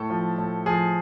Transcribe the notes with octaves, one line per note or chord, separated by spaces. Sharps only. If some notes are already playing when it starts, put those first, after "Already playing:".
Already playing: A2 A4
F3
A2
F3 G#4